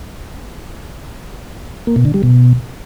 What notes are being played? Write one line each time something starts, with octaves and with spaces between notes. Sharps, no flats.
A#3
B2
D3
G3
B2